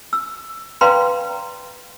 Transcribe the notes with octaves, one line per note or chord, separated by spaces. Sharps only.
E6
B4 D5 F5 G5 A#5 C6